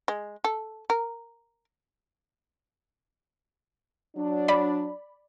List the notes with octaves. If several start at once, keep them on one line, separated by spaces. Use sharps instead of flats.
G#3
A4
A#4
F#3 D4
D5 B5